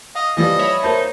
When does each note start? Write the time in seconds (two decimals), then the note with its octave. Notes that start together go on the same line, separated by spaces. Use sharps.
0.15 D#5 F5
0.37 E3 F3 G3 D#5
0.59 C#5 E5 B5
0.83 A#3 D#4 C5 A5